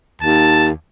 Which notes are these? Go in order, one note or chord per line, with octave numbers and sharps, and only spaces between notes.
D#2 A5